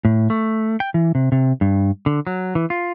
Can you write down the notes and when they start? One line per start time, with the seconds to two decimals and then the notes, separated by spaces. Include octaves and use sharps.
0.05 A2
0.30 A3
0.80 G5
0.94 E3
1.15 C3
1.32 C3
1.61 G2
2.06 D3
2.27 F#3
2.55 E3
2.70 F4